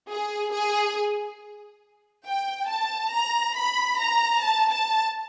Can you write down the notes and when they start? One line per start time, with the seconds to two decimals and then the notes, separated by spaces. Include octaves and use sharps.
0.10 G#4
0.53 G#4
2.27 G5
2.70 A5
3.14 A#5
3.57 B5
4.00 A#5
4.43 A5
4.71 A5